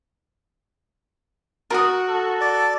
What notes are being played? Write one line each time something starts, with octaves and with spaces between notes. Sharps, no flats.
F#4 A#4 D#6
A4
D5